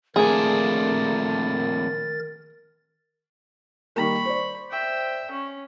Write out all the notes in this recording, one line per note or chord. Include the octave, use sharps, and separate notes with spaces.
F2 A#2 D#3 A3 D4 G#4 A#4 A6
D#3 G3 A#3 B5 C#6
C5 D5
E5 G5
C#4